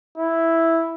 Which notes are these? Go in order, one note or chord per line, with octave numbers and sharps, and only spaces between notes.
E4